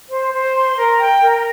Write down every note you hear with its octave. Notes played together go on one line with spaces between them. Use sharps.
C5
C5
C6
A#4
G5
A#4